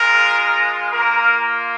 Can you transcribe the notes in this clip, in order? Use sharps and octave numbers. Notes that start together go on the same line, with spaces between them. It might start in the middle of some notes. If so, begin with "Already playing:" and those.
Already playing: G#3 F4 A#4
A#3 F4 A#4